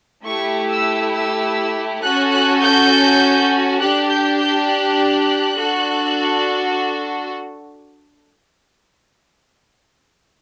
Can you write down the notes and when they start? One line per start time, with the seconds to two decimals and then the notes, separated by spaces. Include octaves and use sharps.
0.25 A3 E4 G4 C#6
0.68 E6
1.13 E6
2.02 C#4 F#4 A4 F#6
2.32 F#6
2.61 G6
3.79 D4 G4 F#6
4.08 G6
4.38 G6
4.67 F#6
5.56 D4 F#4 A4